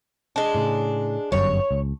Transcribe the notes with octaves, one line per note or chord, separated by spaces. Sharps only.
G#3 D4
A2 C#3
G1 F#2 G3 C#5
C#2